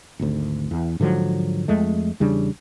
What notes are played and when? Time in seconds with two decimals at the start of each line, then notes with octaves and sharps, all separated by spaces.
0.19 G#1 D2
0.71 E2
1.00 G#2 D3 F3 F#3
1.68 F2 G#3 A3
2.20 E2 C#3 G3 D4